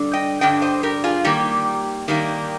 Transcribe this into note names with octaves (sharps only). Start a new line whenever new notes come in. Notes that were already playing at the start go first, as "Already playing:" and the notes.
Already playing: G2 D3 G3 D4
D#5 G5
G2 D3 G3 D4 D#5 G5
C5 D#5
G4 A#4
F4 G#4
D#3 G3 A#3 G4
D#3 G3 A#3